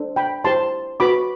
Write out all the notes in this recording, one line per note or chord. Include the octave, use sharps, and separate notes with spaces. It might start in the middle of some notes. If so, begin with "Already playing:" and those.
Already playing: D4 A4 C5
G5 B5
E4 G4 C5 A5 C6
F#4 B4 B5 D6